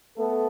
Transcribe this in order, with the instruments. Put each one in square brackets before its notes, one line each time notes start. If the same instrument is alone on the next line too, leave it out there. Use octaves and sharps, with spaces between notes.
[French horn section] A3 B3 A4